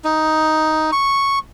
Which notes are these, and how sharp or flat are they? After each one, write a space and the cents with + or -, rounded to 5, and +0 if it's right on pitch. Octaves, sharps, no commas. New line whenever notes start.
D#4 +5
C#6 -5